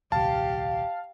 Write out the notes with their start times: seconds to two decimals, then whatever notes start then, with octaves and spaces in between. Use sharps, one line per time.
0.12 D#1 C2 G4 F5 A5